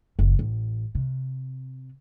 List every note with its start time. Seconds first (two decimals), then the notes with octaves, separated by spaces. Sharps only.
0.19 F#1
0.39 A1
0.95 C3